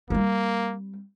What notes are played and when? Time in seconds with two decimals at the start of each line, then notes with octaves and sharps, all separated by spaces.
0.10 G3 A#3 C4